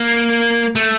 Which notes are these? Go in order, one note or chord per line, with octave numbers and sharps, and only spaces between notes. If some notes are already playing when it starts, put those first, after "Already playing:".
Already playing: A#3
A3